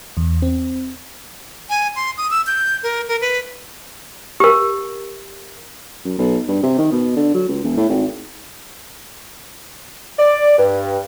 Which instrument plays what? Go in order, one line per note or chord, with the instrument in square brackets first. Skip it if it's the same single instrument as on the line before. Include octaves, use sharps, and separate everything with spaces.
[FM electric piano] E2
C4
[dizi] G#5
C6
D#6
E6
G6
A#4
A#4
B4
[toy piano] G4 A#4
[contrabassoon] F#2
B1
G2
C3
D#3
B2
D3
F#3
C#2
E1
A2
G#1
[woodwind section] D5
G2